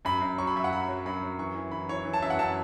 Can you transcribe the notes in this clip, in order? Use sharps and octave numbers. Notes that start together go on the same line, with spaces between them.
F#2 B5
F#2
F#3 C#6
B5
F#2 E5
F#5
F#3 B5
F#3
F#2 B5
F#3
E3 C#6
E3
E3 B5
E3 C#5
E3
A5
F#2 E5
F#5
F#2 A5